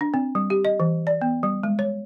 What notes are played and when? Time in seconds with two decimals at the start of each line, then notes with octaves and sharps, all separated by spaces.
0.01 D4
0.14 C4
0.35 G3
0.50 G4
0.65 D#5
0.80 E3
1.07 D5
1.21 B3
1.43 G3
1.63 G#3
1.79 C#5